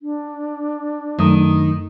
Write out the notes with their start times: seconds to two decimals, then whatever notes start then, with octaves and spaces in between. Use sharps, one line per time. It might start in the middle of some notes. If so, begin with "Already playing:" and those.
0.01 D4
1.19 F#2 D#3 A3 D#6